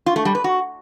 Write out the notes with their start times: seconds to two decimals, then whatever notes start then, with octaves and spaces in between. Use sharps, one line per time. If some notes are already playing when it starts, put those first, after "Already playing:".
0.06 F4
0.16 A3
0.25 G3
0.35 B4
0.44 F#4